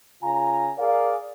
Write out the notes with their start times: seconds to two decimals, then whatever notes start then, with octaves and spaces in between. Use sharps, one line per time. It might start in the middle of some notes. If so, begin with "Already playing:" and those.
0.22 C#3 F4 G#5 A#5
0.79 G#4 A#4 D5 F5